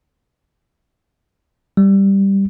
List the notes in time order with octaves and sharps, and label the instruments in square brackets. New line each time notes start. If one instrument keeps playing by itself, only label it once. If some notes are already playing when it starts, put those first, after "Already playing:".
[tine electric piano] G3